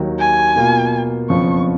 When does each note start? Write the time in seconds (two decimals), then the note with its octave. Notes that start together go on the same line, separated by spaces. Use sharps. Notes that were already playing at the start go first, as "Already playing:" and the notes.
Already playing: D#2 D#3 F#3
0.19 G#5
0.56 B2 A#3 F4
1.29 F#1 F2 F3 B3 C#6